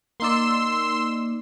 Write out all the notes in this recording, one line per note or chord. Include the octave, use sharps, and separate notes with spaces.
A#3 D#4 D5 C6 E6